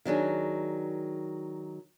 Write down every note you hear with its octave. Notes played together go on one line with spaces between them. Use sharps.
D#3 F#3 D4 G#4